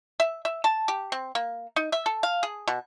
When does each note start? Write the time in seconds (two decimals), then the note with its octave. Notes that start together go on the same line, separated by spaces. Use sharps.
0.20 E5
0.45 E5
0.64 A5
0.88 G4
1.12 C4
1.35 A#3
1.76 D#4
1.92 E5
2.06 A4
2.23 F5
2.43 G#4
2.68 B2